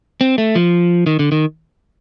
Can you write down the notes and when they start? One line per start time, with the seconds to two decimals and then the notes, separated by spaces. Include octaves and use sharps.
0.21 C4
0.38 A3
0.55 F3
1.06 D#3
1.19 D3
1.32 D#3